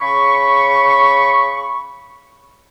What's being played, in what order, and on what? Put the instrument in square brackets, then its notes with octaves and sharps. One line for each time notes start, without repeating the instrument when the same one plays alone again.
[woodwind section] C#3 B5 C#6